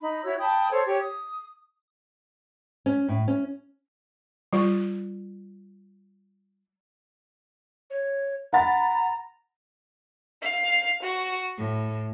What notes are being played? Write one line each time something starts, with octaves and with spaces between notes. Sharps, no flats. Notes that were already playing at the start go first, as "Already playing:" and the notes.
D#4 B5
E4 F#4 C#5 E6
G5 A5 B5 D#6
A4 C5 C#5
G4 C#5
D#6
C#4
A2
C#4
G3 F4
C#5
F#5 A#5 B5 A6
F5
F#4
A2